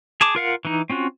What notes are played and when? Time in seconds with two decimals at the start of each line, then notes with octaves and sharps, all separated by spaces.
0.21 G#4 A5 D6
0.35 F4 A#4 F5 F#5
0.65 E3 D#4
0.90 C4 C#4 F4 F#4